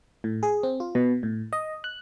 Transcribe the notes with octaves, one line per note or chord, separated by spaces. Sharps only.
A2
G#4
C4
F4
B2
A2
D#5
F#6